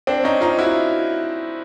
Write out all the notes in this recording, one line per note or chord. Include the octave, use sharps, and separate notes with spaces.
C4 D4
C#4 D#4
D#4 F4
E4 F#4